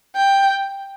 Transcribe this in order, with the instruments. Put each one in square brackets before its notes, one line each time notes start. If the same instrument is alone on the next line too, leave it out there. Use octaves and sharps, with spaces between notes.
[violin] G5